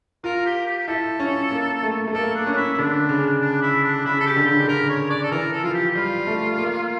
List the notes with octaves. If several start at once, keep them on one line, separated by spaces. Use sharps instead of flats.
F4 A#4
G4
G4
G4
E4 A4
C#4
A#3
A3
A3
A#3 A4
D4
C#4
D4
E4
E4
D3 D4
C#3
D4
E4
D4
C#3 E4
A4
G4
D3
C#3 G4
D3 A#4
C#5
D5
A4
E3 A#4
A4
F3 F4
G4
G4
G3 F4
A3
A#3